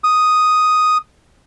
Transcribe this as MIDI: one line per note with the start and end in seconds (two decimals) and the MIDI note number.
0.04 0.97 87